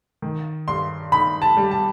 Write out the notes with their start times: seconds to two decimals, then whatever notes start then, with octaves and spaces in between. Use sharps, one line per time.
0.22 D#3
0.68 G2 C6
1.12 D#4 B5
1.42 A5
1.57 G3
1.71 A5